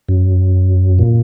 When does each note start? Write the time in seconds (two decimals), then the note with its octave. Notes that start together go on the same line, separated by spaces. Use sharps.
0.09 F#2
0.99 A#2